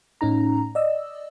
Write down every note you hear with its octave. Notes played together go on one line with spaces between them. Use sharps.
A2 C#4 D#4 A#5
D5 D#5 E6